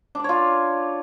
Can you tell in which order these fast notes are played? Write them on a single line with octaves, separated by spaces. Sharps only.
D4 D5 C#5 F4